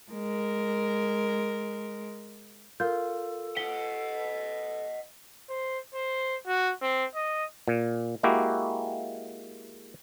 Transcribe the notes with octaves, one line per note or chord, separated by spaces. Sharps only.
G#3 A#4
F4 A4 A#4 G6
D#5 F#5 B6 G7
C5
C5
F#4
C4
D#5
A#2
G#3 A#3 E4 F#4 G4